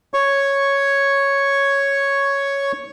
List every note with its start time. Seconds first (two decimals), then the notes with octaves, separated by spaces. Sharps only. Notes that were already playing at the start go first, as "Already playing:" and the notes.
0.14 C#5 C#6